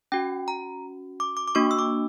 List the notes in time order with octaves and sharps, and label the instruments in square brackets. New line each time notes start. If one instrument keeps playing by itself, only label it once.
[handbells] C#4 F#4 G5
A#5
D6
D6
D6
A#3 D4 F#4 C#6
E6
D6